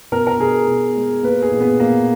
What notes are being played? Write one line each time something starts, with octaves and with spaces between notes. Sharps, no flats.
B2 A#4
A#4
B2 G#4
B2
G#3
A#3 B4
G#4
A#2
B3
A#2 A#3